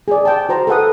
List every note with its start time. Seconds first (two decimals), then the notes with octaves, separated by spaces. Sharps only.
0.08 G#4 D5
0.25 G5 A5
0.49 F#4 C5 A#5
0.67 A4 B4 F#5 D#6